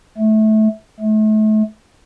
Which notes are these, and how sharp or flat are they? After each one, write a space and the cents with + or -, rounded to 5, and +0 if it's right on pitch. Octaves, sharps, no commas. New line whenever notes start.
A3 -20
A3 -35